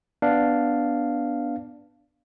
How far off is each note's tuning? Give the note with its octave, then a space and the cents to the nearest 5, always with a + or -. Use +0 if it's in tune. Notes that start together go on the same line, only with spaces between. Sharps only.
B3 +0 D4 +0 F5 -5